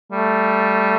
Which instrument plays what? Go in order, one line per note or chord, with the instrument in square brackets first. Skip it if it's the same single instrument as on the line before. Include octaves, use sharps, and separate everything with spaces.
[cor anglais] G3 [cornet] A3